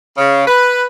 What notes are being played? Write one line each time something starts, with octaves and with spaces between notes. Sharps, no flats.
C#3
B4